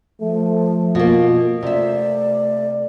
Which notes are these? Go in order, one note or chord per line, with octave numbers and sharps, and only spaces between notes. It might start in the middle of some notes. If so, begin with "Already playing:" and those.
F3 A3
B2 A#3 F4
C3 A3 D5 E5